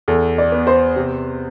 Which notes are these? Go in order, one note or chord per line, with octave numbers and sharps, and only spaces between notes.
E2 A4
D5
B3
C5
C3